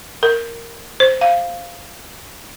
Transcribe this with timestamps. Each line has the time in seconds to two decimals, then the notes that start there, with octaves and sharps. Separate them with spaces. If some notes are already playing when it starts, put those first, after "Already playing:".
0.23 A#4
1.00 C5
1.21 F5